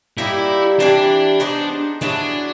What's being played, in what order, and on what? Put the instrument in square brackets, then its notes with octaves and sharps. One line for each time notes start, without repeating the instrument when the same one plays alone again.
[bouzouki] G3 A#3 D#4 [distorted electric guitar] E4
[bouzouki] E3 G3 C4 E4 [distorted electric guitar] D4
[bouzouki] B3 D#4 G#4 C5
[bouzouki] F#3 B3 E4 G#4 [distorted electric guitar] D4